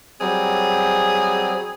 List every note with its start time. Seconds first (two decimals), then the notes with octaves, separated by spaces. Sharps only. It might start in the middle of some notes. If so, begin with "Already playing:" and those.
0.21 F#3 G3 C4 G#4